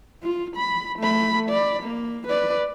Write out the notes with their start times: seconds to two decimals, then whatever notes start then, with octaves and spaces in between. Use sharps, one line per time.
0.23 F4
0.56 B5
0.99 A3 B5
1.49 D5 B5
1.83 A#3
2.27 B4 D5